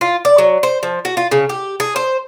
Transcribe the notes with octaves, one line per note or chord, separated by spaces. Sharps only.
F4
D5
F#3
C5
F3
F#4
F4
C#3
G4
G#4
C5